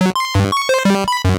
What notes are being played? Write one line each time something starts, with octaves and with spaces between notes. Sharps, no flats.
F#3
C6
G2
C#6
C5
G3
B5
F#2